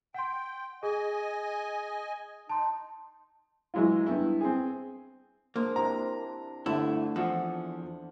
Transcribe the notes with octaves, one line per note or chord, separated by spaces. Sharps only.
F#5 G5 C6
G#4 D#5 G#5
D#4 A5 C6
E3 F#3 G#3 E4 F4
G2 B3 E4
C4 G#4
F3 G#3 A#3 D4
C3 D4 E4 A#5
G1 D3 A3 E4
E2 F3 F#5